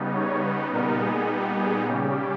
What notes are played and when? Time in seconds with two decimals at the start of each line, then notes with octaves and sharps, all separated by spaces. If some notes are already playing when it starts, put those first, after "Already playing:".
Already playing: C#3 G3 B3 D#4
0.14 C#5
0.43 B4
0.71 A#2 G3 B3 D#4 A#4
1.00 G#4
1.28 G4
1.57 G#4
1.86 C#3 G3 C#4 G4